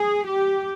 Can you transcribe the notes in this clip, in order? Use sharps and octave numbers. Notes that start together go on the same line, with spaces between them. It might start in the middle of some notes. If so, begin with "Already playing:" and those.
Already playing: G#4
G4